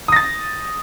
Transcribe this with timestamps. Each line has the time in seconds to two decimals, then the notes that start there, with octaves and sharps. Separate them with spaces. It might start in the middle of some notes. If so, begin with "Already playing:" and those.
0.08 D#6
0.12 A#6
0.16 A6